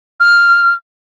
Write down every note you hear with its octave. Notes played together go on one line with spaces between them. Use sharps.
F6